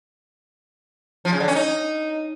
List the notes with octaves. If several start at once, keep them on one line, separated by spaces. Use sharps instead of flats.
F3
C#3
D3
C#4
D#4